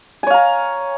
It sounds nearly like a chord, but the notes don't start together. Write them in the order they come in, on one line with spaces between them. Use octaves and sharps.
G#5 C#5 F5 A#5